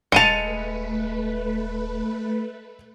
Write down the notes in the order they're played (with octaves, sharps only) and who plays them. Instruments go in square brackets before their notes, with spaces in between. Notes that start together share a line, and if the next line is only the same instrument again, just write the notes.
[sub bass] D#1 [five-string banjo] G#3 A5 [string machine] A3 B4 [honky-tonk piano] C#7 D#7 F7